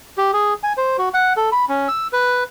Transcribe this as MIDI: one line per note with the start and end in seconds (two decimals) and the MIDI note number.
0.18 0.31 67
0.33 0.54 68
0.63 0.73 80
0.78 0.97 72
0.98 1.09 66
1.14 1.33 78
1.37 1.50 69
1.52 1.65 83
1.69 1.88 61
1.88 2.07 88
2.13 2.44 71